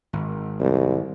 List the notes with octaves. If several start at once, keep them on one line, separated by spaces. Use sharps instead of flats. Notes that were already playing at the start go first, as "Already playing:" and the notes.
G#1
C2